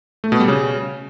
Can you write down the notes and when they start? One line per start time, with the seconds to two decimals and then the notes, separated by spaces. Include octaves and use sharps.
0.24 A3
0.32 B2
0.40 G3
0.48 C#3